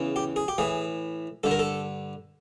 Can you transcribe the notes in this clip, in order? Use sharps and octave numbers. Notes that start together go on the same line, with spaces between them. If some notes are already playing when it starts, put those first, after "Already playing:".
Already playing: E2 C#3 E3
G4
G#4
G4
A2 E3 G#4
G2 D3 A4
A#4
A4